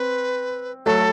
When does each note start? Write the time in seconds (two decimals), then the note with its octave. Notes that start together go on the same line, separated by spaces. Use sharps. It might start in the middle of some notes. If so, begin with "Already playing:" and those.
Already playing: C4 B4
0.86 F#3 A3 A4